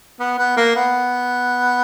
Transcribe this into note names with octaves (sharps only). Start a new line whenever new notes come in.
B3
B3
A#3
B3